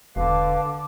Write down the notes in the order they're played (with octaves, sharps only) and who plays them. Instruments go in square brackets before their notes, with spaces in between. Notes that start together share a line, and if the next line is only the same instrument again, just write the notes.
[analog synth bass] E1 [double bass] D3 [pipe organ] B4 F5 [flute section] A5 D6